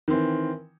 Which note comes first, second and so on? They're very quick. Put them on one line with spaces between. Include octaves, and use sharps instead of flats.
D#3 C4 E3